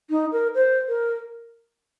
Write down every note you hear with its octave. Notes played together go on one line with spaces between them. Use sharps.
D#4
A#4
C5
A#4